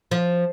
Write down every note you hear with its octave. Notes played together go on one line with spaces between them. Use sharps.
F3